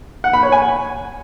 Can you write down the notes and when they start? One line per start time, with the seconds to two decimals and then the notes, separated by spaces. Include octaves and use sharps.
0.24 F#5
0.33 B5
0.43 C#5
0.52 G#5